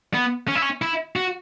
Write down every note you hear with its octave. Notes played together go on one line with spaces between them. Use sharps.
B3
C#4
E4
C#4
E4
F#4